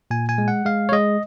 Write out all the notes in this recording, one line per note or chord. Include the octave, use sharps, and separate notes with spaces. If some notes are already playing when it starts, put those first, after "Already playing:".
A#2 G#5
G#5
G#3
F#5
G#3 F5
C#5
G#3 D#5